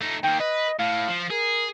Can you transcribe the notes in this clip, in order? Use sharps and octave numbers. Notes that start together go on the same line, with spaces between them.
A3 D#4
D#3 A#3 G5
B4 D#5
A2 F5
F3
G#4 A#4